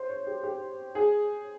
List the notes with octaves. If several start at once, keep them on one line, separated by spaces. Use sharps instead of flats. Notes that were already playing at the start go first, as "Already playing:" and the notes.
Already playing: C5
C#5
G4
G4
G#4